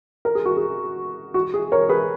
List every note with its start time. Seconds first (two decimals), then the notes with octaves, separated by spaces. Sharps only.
0.25 A#4
0.35 G#4
0.45 F#4
0.57 G#4
1.34 F#4
1.54 G#4
1.72 A#4 C#5
1.89 G#4 B4